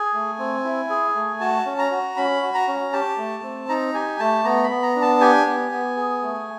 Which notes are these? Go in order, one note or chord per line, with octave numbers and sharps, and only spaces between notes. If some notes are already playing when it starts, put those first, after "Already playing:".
Already playing: G#4 G#5
A3
C4
E4
G#4
A3
F#4 A5
C#4
A#5
F#4
C#4 B5
F#4
A#5
C#4
G4 A5
A3
C4
D#4 A#5
G4 G#5
A3 A5
B3 A#5
B5
B3
A#5
D4
A5
G4 G#5
B3
B3
G#4
A3